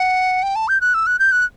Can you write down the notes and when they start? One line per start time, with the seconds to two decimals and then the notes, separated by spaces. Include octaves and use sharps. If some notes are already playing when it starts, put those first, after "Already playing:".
Already playing: F#5
0.43 G5
0.56 A5
0.68 G6
0.81 F#6
0.94 E6
1.07 F#6
1.19 G6
1.32 F#6